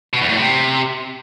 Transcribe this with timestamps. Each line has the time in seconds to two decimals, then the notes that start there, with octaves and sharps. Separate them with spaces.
0.13 B2
0.21 E2
0.29 A2
0.37 C3